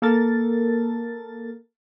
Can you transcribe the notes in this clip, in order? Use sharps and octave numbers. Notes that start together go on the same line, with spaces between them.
A#3 A4 A#4 A6